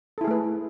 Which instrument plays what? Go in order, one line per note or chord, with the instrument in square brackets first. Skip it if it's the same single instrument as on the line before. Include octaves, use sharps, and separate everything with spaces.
[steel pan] A4
E4
G#4
A3
B4